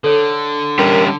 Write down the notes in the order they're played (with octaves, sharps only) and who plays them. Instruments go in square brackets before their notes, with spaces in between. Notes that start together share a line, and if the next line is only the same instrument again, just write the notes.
[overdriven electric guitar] D3 [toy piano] A4 C#5
[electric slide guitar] G3 C#4 G4 [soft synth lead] A#4